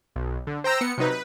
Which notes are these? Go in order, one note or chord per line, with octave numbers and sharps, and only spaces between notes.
B1
D3
C5 G5 A#5 E6 A#6
B3 C#7
C3 F#3 D#4 B4
B4